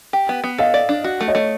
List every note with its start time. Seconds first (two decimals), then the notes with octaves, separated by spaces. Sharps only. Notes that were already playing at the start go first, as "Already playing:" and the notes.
0.13 G4
0.29 B3
0.44 B3
0.58 A4 D#5 F5
0.74 D5
0.89 D4
1.04 F#4
1.21 A3
1.28 C#5 D#5
1.35 A3